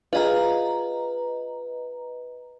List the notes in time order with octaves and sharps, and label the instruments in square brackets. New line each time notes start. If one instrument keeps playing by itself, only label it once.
[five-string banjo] F4 G#4 [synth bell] B4 D#5 A#5